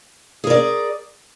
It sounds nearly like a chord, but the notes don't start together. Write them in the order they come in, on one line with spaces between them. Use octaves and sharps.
G#4 A#4 D5